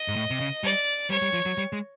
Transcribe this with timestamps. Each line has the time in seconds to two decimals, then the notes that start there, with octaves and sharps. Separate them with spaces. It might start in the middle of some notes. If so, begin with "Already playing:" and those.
Already playing: D#5
0.08 G#2
0.16 A2
0.30 C3
0.40 C#3
0.64 G3 D5
1.10 G3 C#5
1.22 G3
1.33 F3
1.46 F#3
1.58 G3
1.73 G#3